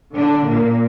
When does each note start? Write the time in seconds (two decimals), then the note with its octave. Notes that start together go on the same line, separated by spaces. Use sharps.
0.16 D3 D4
0.46 A#2 A#3